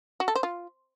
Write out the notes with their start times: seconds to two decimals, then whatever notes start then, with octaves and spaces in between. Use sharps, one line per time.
0.20 F#4
0.28 A4
0.35 C5
0.43 F4